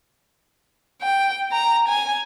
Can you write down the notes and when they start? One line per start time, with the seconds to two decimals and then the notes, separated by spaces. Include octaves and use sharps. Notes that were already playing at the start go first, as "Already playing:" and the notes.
1.03 G5
1.52 A#5
1.88 G#5